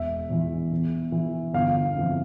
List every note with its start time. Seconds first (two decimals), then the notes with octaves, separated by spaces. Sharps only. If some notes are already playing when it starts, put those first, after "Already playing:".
Already playing: E1 E5
0.30 E2 E3
0.72 E2
1.12 E3
1.54 G1 F5
1.95 F2 E3